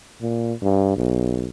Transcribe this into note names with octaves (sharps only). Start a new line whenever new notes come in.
A#2
G2
B1